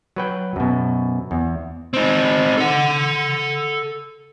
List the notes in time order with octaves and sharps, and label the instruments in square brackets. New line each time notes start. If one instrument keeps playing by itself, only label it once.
[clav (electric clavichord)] F#3 B4 G5
F#2 B2
E2
[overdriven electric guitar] C4 D#4
A4 F#5